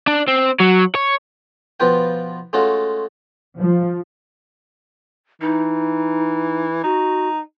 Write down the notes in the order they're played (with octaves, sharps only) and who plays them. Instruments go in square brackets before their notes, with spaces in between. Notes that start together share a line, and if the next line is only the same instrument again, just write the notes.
[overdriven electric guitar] D4
C4
F#3
C#5
[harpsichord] B2 F3 F4 B4 G5
G#3 A3 C#4 F4 F#4
[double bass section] F3
[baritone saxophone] E3 [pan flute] D#4
[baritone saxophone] D#4 [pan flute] F#4